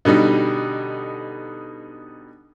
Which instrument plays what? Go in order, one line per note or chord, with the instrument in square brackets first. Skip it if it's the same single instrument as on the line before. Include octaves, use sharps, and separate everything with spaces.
[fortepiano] B2 D3 G3 D#4